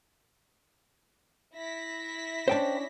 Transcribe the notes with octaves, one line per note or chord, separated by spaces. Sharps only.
E4 A#6 B6
C#4 D4 C5 G5 A5